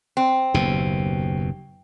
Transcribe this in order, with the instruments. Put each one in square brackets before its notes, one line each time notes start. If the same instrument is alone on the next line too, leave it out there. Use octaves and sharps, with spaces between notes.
[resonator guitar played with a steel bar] C4
[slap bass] F#1 D#2 B2